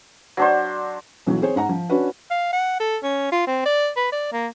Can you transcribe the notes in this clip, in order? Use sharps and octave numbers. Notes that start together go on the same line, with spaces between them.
F#3 D4 C5
B1 E3 F#3
C4 G#4 C5 C#5
G#2 F#5 A#5
F3
C#4 D4 F#4 B4
F5
F#5
A4
C#4
F4
C4
D5
B4
D5
A#3